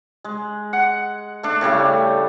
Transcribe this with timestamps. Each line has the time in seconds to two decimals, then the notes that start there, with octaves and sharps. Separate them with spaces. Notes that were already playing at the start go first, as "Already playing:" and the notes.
0.24 G#3
0.73 F#5
1.43 A3 D4
1.61 A2 C#3 G3 A3